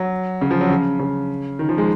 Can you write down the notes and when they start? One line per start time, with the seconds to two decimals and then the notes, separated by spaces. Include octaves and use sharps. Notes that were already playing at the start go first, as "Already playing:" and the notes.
Already playing: F#3
0.41 C#3
0.51 F3
0.61 F#3
0.70 C#3
0.99 C#3
1.59 D#3
1.69 F3
1.78 G#3